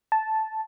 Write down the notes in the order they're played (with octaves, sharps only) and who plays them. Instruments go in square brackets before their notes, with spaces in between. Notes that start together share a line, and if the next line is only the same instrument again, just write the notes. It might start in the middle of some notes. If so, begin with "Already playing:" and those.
[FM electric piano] A5